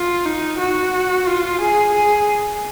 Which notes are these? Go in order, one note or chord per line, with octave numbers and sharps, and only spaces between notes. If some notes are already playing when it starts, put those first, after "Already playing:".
Already playing: F4
D#4
F#4
F4
G#4
G#4